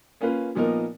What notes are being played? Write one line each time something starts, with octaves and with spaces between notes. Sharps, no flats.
A#3 C#4 F4 B4
A#2 F3 B3 D#4 A#4